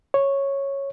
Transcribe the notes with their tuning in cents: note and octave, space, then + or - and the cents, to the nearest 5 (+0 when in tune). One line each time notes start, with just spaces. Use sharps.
C#5 -5